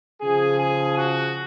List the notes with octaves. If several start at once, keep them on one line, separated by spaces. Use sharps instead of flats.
C#3 F3 G#4
G#4
F#4